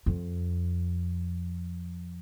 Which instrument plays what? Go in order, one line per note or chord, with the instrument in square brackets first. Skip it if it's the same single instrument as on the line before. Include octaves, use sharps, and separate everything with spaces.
[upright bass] F2